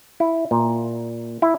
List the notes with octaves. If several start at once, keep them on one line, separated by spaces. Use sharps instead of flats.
E4
A#2
E4